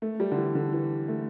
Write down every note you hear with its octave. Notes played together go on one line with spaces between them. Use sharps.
A3
G3
D3
E3
D3
E3
A3